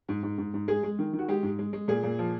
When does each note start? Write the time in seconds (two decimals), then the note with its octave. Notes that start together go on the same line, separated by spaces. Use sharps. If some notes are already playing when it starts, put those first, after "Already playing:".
0.09 G#2
0.23 G#2
0.38 G#2
0.54 G#2
0.68 G#3 G#4
0.83 G#3
0.99 D#3
1.13 D#3
1.19 F#4
1.28 G#3 G4
1.43 G#2
1.59 G#3
1.73 G#3
1.88 A#2 G#4
2.03 A#2
2.19 F3